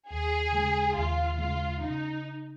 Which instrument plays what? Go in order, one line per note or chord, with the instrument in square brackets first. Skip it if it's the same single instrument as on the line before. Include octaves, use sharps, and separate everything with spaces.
[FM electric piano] D#2 [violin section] G#4
[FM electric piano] C#3 G#3
[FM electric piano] D#2 [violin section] F4
[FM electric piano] C#3 G#3 [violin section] F4
[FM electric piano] C#3 [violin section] D#4